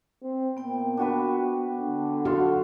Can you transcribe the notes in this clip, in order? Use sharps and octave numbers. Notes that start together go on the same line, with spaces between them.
C4
A#2 B3 G5
D4 F#4 B4
D3
F#4 A4 F5 C6